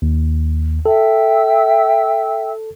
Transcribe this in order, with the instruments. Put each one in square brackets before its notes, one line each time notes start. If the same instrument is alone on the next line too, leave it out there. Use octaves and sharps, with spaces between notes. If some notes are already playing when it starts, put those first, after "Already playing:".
[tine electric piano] D#2
[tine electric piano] A4 [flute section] E5 G5 E6